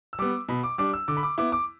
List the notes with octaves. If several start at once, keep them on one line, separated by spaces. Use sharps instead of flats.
E6
G3 B3 D6
B2 B5
D6
G3 D4 D6
E6
D3 D6
B5
D6
B3 E4 D6
D6